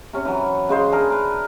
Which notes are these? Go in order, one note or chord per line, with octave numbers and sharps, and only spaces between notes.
C3 C#4
E3 F#3
C#3 G#3 C5
D4 G#4 A#4
A#4 B4